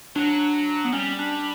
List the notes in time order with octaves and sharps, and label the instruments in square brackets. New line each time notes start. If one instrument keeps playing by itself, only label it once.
[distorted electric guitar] F#3 [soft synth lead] D4
[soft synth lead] B3
[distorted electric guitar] G3 [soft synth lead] C#4
[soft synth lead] D4